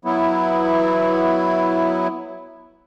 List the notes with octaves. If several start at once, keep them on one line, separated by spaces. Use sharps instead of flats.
F#3 B3 E4